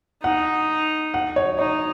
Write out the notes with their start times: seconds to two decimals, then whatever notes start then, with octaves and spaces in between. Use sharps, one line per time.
0.24 D#4 F#5
1.14 F#5
1.36 C#5
1.59 D#4 C#5